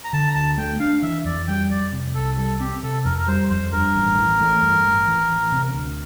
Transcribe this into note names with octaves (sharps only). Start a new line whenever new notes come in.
A#5
D3 A5
A#5
D2 A5
A3 G5
D4 F5
E3 E5
F2 D5
G3 G5
F2 D5
C3
C2 A4
G3 A4
C4 G4
C3 A4
F2 A#4
A#4
G3 C5
F2 C5
G2 A#4
A1
E3
A3
G2
A1
E3
A1
C3
D2